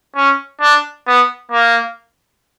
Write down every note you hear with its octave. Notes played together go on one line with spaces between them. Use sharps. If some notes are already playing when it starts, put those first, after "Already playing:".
C#4
D4
B3
A#3